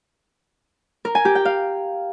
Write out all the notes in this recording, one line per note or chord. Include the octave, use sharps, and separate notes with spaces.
A#4
G#5
G4
G5
F5